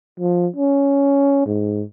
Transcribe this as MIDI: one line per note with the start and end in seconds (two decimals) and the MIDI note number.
0.20 0.48 53
0.56 1.42 61
1.46 1.83 44